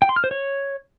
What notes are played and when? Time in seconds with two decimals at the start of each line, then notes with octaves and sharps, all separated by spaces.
0.02 G5
0.09 C6
0.16 F6
0.24 C5
0.31 C#5